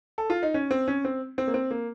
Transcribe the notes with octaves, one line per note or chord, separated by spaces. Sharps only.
A4
F4
D#4
C#4
C4
C#4
C4
C4
A#3
C4
A#3